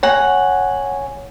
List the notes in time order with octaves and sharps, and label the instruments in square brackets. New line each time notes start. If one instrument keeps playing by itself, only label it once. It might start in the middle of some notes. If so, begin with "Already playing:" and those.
[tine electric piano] C#5 G#5 [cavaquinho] F#5 A#5